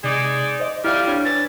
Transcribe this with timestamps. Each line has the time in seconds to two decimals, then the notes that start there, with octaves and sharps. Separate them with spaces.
0.04 C3 G#3 D#4 D5
0.60 C5 D#5
0.84 F2 G3 E4 F5 F6
1.08 D4 C#5 G#6
1.25 E3 A6